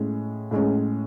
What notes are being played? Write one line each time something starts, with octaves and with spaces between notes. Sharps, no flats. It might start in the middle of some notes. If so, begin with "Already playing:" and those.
Already playing: A2 G#3 C#4
A2 G#3 C#4